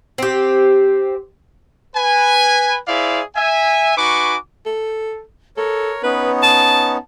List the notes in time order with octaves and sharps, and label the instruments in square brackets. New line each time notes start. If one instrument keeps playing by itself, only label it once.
[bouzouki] C4 G4
[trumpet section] B4 G#5
E4 G#4 C5 D5 E5 F5
E5 G#5
D#4 F#4 B4 G#5 C#6 D6
[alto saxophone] A4
[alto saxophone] A4 [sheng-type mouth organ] A#4 C#5
[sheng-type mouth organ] B3 C#4 D#4 [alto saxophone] B4
[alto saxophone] A5